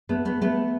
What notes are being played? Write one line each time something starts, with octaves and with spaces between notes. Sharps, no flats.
A3 B3
A3 B3
A3 B3